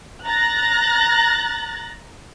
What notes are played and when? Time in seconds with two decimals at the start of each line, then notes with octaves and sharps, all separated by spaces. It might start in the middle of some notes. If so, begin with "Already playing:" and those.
0.25 A#5 F#6 A6 A#6